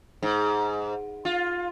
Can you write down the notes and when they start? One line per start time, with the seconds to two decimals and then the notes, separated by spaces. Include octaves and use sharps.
0.23 G#2
1.25 F4